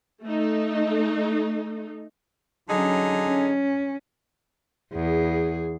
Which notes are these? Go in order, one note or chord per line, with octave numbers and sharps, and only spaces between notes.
A3 D#4
D3 F#3 C#4 D#4 G#4
C#4
E2 G#4